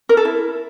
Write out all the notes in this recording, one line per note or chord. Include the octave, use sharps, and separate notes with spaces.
A#4
A4
E4